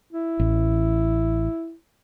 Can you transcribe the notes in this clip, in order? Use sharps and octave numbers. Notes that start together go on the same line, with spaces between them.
E4
A1